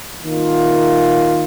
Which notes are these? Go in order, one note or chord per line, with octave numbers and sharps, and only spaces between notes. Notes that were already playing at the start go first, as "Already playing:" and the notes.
D#3 A#3 F4